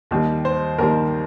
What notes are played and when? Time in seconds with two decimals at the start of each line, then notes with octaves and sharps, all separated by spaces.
0.11 D#2 D#3 G3
0.45 C5
0.78 D#2 D#3 G3 A#4